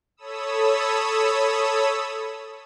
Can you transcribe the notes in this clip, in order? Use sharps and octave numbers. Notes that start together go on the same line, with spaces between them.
A4 C#5 B5 D#6 E6